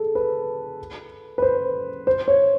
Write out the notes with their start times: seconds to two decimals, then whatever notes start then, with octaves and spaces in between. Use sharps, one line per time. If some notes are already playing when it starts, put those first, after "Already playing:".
Already playing: G#4 A4
0.15 B4
1.38 B4
1.42 C5
2.07 C5
2.28 C#5